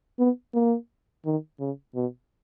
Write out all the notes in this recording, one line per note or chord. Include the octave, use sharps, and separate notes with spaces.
B3
A#3
D#3
C#3
B2